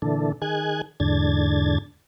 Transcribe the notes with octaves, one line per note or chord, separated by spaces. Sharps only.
A#2 D3 E3 D4 A4
D#3 G#4 G#5 F#6 G#6
E2 G#2 D3 D4 G#6 A6